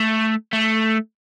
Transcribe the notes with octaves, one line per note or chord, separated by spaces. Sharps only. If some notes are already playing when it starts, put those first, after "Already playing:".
Already playing: A3
A3